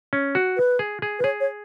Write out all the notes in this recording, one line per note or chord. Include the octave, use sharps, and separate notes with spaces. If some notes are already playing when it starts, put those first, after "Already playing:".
C#4
F#4
B4
G#4
G#4
B4
G#4 C#5
C#5